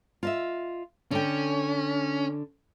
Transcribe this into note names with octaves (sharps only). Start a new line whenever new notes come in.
F4 D#5 E5
D3 C#4 G5